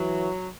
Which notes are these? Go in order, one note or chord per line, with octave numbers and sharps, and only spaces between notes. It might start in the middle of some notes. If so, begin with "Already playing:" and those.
Already playing: E3 F#3